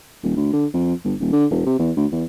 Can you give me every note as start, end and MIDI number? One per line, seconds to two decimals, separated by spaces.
0.23 0.35 27
0.37 0.53 38
0.53 0.66 50
0.73 0.94 41
1.05 1.14 31
1.20 1.30 27
1.32 1.46 50
1.51 1.65 28
1.66 1.74 48
1.79 1.91 40
1.97 2.06 38
2.12 2.24 40